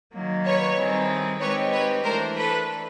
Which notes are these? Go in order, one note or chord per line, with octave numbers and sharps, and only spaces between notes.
D#3 F#3 A#3
B4 C#5
D#3 G3 C4 E4 G#4
G#3 C4 D#4 G4 B4 C#5
B4 C#5
E3 A3 D4 A#4 C5
A4 B4